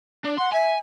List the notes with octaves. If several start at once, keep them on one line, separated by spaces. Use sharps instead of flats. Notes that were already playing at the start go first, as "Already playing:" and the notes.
D4 D5
F#5 C6
E5 G#5